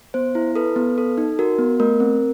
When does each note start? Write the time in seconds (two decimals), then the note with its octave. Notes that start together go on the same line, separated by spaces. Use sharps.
0.14 B3 C5
0.35 E4
0.55 A4 B4
0.76 B3
0.98 A4
1.18 D#4
1.39 F#4 A#4
1.59 B3
1.80 A3 A#4
2.00 C4